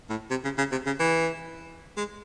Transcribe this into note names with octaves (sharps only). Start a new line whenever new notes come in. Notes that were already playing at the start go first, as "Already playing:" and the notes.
A2
C3
C#3
C#3
C3
C#3
E3
G#3